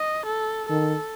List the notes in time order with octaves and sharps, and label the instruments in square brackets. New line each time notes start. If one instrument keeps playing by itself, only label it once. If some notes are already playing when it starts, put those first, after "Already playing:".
Already playing: [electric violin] D#5
A4
[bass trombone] D#3 [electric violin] A4